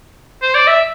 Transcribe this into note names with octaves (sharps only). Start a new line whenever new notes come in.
C5
D5
E5